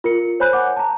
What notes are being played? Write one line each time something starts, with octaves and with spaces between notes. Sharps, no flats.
F4 A#4 C#7
C5 C#5 G#5 B5 F#6 G6
F#5 G#5 D6
A5 A#5